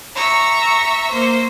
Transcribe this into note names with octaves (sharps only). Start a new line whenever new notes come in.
E5 A#5 C#6
A#3 C5